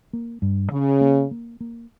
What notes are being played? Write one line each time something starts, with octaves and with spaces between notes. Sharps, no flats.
A#3
G2
C#3 C#4
A#3
A#3
A#3